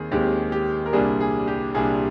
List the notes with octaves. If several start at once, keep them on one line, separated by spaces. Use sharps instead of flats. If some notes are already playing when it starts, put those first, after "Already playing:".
Already playing: D#2 D#3 C4 G#4
D#2 D#3 G#3 C4 G4
G4
A#4
C2 A#2 G3 D4 G#4
G#4
G4
C2 A#2 G3 D4 G#4